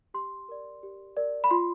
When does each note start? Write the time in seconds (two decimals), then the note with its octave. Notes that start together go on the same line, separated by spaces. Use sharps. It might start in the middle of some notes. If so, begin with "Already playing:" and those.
0.14 G4 C6
0.49 A#4 D5
0.83 G4
1.17 A#4 D5
1.44 B5
1.51 F4 C6